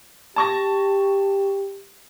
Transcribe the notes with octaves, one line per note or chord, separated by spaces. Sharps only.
G4 A5 C#6 A#6